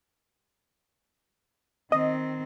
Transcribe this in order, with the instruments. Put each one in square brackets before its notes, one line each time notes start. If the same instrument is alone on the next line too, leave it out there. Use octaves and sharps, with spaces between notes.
[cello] D#3 C4 [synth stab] D#5